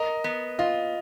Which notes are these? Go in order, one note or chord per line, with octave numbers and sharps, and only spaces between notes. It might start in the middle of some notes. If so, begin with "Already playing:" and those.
Already playing: A#4 D#5
B3
F4 D#5